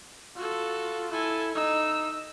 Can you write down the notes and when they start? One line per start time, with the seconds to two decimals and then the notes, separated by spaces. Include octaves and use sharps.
0.36 F4 F#4 A4
1.12 E4 A4 G#5
1.55 D#4 E6